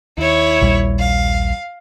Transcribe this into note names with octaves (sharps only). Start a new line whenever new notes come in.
D#2 E4 C#5
A#1 D#2 G3
F5